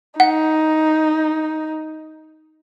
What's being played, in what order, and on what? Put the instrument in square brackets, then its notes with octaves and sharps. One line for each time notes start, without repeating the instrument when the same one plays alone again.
[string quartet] D#4 [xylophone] F#5